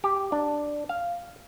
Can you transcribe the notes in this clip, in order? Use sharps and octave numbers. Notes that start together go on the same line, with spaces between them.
G4
D4
F5